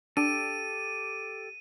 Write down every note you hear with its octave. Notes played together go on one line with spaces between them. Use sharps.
D4 G4 A4 D#7